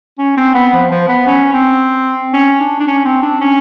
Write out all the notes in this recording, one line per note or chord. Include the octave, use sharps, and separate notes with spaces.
C#4
C4
B3
F3
F3
B3
C#4
C4
C#4
D4
D4
C#4
C4
D4
C#4